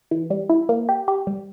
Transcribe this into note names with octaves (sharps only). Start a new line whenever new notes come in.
E3
G3
E4
A#3
G4
G4
G3